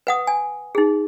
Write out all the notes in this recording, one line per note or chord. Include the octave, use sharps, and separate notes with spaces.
B4 F#5 D#6
G#5
D#4 G#4